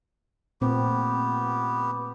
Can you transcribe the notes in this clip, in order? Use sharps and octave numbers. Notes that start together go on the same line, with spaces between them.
A#2 A3 B3 C4 G4